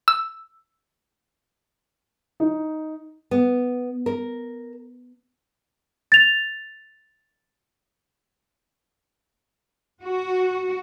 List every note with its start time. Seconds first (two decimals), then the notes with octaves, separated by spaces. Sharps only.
0.08 E6
2.40 D#4
3.31 B3
4.06 A#4
6.12 A6 F7
10.02 F#4